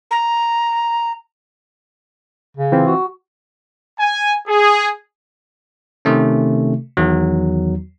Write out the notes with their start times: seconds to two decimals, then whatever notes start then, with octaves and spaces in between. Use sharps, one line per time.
0.11 A#5
2.57 C#3
2.72 E3 C4 F4
2.87 F#4
3.99 G#5
4.47 G#4
6.05 C3 D#3 A3 C#4
6.97 E2 D#3 F#3